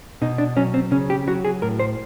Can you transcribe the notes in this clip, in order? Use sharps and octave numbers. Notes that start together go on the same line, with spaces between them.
B2 D#4
D4
F#3 C#4
C4
C#3 C#4
G4
F#3 F#4
G#4
A2 A#4
C5